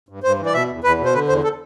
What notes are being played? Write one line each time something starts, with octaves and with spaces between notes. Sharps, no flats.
G2
G2 C5
E3
D5
B2 E5
E2
E2 B4
B2
C5
D3 B4
E2 C5
A4